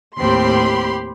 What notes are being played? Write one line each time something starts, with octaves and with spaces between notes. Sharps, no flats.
D#2 A2 C4 G4 B5 C6